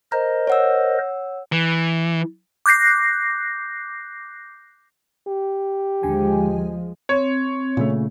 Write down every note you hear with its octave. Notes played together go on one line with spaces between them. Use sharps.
A#4 C5 D#5 A#5
C#5 F#5 E6
E3
D6 F#6 G6 A#6 C7
G4
D#2 D3 F3 G#3 G#5
C4 C#5
A#2 C#3 A3